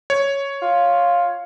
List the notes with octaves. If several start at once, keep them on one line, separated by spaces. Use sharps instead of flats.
C#5
F4